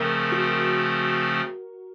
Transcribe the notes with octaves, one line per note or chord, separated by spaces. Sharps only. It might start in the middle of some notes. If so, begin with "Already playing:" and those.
Already playing: C#3 F3 A3 C4 A#4
F#4